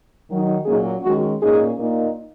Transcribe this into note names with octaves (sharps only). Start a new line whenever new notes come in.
D#3 F#3 D#4
A#2 F#3 A#3 C#4 D#4 G#4
D#3 G#3 C#4 F#4
A#2 A#3 C#4 D#4 G#4
A#2 A#3 D#4